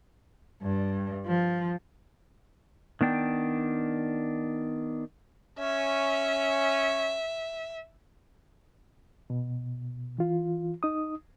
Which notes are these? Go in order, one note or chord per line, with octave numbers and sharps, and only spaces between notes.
G2
F3
D#3 B3 D4 G5
C#4 E5
B2
E3 F4
D#4 D#6